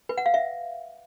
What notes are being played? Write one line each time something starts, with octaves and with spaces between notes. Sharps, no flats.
B4
F#5
F5
E5